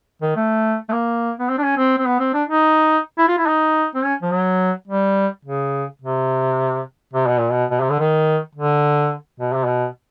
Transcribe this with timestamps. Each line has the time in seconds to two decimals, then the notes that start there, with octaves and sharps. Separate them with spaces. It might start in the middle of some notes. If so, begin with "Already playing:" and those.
0.22 D#3
0.36 A3
0.89 A3
0.93 A#3
1.39 B3
1.50 C4
1.58 D4
1.63 C#4
1.77 C4
1.98 C4
2.06 B3
2.20 C4
2.34 D4
2.49 D#4
3.18 E4
3.28 F4
3.38 E4
3.46 D#4
3.95 C4
4.04 C#4
4.22 F3
4.32 F#3
4.88 G3
5.45 C#3
6.02 C3
7.13 C3
7.27 B2
7.38 A#2
7.51 B2
7.71 B2
7.81 C3
7.90 D3
7.99 D#3
8.55 D3
9.40 B2
9.53 C3
9.66 B2